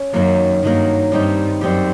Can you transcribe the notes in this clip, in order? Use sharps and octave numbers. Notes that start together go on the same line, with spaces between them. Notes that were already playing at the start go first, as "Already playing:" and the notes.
Already playing: C#4
F#2 D#3 F#3 A#3
G2 D#3 F#3 A#3
G2 G3 C4 D#4 G4
F#2 G3 C4 D#4 G4